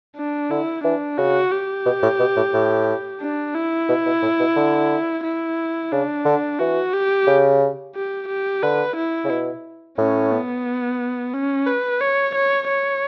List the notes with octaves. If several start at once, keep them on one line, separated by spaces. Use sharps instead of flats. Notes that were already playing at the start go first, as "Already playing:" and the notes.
D4
D3 E4
E3 D4
C#3 F#4
G4
B2
A2
B2
A2
A2
D4
E4
B2
B2
A2
B2
D3
E4
C#3 D4
D3
E3 F#4
G4
C#3
G4
G4
D3 B4
E4
C#3
B2
A2 C#4
B3
C#4
B4
C#5
C#5
C#5